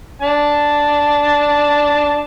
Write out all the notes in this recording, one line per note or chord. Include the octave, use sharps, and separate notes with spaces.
D4 A5